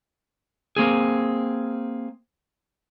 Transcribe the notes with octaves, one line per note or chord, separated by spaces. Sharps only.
A#3 C4 G#4